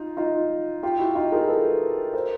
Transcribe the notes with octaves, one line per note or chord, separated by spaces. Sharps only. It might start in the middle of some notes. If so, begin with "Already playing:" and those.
Already playing: D#4 F4
D#4 F4
F4 G4
E4 F#4
D#4 F4
G#4 A#4
A4 B4
A#4 C5